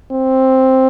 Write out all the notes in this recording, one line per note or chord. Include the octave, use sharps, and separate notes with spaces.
C4